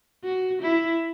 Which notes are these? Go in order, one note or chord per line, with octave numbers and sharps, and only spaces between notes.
F#4
E4